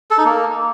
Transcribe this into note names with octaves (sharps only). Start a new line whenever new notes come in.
A4
D#4
A#3